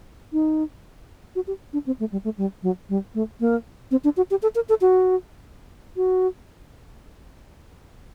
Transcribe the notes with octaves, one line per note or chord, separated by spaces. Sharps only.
D#4
F#4
G4
D4
C4
A3
G3
A3
G3
F#3
G3
A3
A#3
C4
D4
F#4
G4
A4
A#4
A4
F#4
F#4